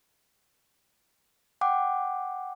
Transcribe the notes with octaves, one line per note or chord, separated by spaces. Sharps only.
F#5 G5 D6